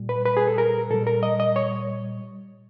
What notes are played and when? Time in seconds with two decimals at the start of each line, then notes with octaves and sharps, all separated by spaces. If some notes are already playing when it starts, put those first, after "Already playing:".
Already playing: A#2 G3
0.09 B4
0.26 B4
0.37 G#4
0.47 A4
0.58 A#4
0.90 A#2 G3 A4
1.07 A#4
1.23 D#5
1.40 D#5
1.56 C#5